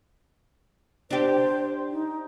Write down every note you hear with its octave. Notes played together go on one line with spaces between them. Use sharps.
D4 G4 C5
D#4